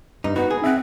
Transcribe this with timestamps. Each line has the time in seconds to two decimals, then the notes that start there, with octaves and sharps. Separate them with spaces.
0.24 G2 D#4
0.36 B3 D#4 F#4 B4
0.50 G#4
0.64 C4 E5 F#5